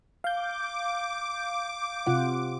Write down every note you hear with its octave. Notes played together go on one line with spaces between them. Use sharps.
F5 D6 G6
C3 F4 F#5